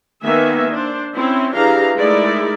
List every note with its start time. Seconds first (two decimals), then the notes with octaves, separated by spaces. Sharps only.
0.23 D#3 A#3 B3 E5 G#5
0.70 D4 C5
1.13 C4 C#4 E4
1.54 E3 D4 G4 G#4 F5 A#5
1.96 G#3 A3 D#4 E4 A#4 D5